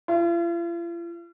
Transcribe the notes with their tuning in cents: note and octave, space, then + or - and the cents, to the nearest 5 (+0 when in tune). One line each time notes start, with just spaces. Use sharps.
F4 -45